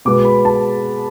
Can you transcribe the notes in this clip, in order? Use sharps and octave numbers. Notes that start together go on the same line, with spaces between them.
B2 G#3 B3 D6
B5
A5